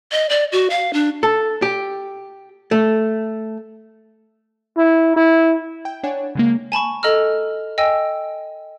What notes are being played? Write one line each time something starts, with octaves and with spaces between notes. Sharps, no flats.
D#5
D5
F#4
F5
D4
A4
G4
A3
E4
E4
G5
D4 C#5 F#5 G#5
C#3 G#3 A#3
G#5 A5 B5 C#6
A4 D#5 A#5 E6 F6
D#5 G5 G#5 E6